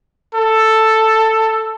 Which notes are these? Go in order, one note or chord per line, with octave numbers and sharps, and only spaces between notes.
A4